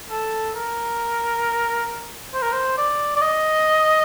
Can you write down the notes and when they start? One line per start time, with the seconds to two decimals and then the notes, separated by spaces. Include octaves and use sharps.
0.11 A4
0.56 A#4
2.33 C5
2.42 A#4
2.52 C5
2.78 D5
3.16 D5
3.21 D#5